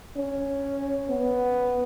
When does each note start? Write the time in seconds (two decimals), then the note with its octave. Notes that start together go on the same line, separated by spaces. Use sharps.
0.16 C#4
1.09 B3